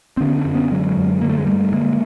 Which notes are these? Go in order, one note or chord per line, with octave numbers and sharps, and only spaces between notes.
C4
D3 B3 C#4
C4 D4
F#2
B3 C#4
D3 F#3 G#3
F#2
D3 A#3
A3
G#3
G2 G3 A3
D3 G#3 A#3